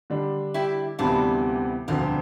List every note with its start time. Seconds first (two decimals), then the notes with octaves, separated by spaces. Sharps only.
0.10 D3 G3 D4
0.54 E4 G4
0.99 D2 C3 E3 G3 B3 D4 F4
1.88 E1 D2 D3 F3 C4 D4 F4